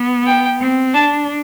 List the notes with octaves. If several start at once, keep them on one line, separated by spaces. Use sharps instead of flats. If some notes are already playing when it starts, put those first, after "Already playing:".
Already playing: B3
G5
C4
D4 A5